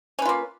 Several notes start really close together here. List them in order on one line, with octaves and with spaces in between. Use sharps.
C#4 B4 F4 A#3